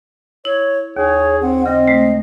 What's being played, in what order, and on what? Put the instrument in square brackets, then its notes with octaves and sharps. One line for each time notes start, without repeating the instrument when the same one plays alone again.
[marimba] E4 [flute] C#5
[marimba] D#2 [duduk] G#4 [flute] C#5
[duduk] C4 [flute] F#5
[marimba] C#3 [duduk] C4 [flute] D#5
[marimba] G#3 A3